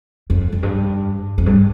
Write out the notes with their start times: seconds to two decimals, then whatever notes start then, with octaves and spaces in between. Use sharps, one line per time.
0.30 F2
0.52 F2
0.63 G2
1.38 F2
1.46 G2